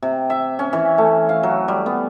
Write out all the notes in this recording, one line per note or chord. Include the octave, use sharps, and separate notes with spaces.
C3
E5
C#4
E3
A3
F5
F#3
G3
B3